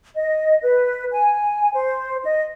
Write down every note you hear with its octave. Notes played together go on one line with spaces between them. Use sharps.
D#5
B4
G#5
C5
D#5